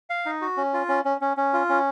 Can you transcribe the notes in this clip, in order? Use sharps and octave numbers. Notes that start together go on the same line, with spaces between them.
F5
D#4
F#4
C#4
F4
C#4
C#4
C#4
C#4
F4
C#4